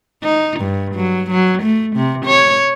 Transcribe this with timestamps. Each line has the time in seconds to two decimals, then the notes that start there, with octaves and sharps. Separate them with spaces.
0.24 D#4
0.60 G2
0.95 F#3
1.31 F#3
1.63 A3
1.96 C3
2.26 C#5